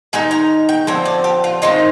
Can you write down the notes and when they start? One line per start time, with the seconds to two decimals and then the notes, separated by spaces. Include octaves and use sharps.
0.13 D#3 G#3 D#4 G#5
0.31 A#5
0.69 G5
0.87 D3 F3 C4 G#5
1.05 D5
1.24 G4
1.44 F4
1.62 D#3 G#3 C4 D#4 F4